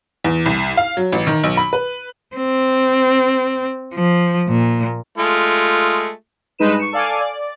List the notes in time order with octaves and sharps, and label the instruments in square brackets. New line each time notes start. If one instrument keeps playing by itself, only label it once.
[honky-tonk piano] E2
C2
F5
F#3
A1
D#3
B1
B5
B4
[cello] C4
F3
A#2
[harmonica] G#3 A3 F4
[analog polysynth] G2 G#3 D#4 B4 D#7 E7
C#6 C#7
A4 D5 F5 G#5 D6
D5